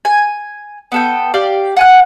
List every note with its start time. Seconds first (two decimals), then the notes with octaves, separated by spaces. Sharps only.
0.05 G#5
0.92 B3 A4 G5
1.34 G4 D5 F5
1.76 F#5 G#5 F#6